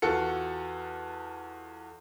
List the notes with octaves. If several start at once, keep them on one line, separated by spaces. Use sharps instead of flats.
E2 F4 F#4 A4 C#7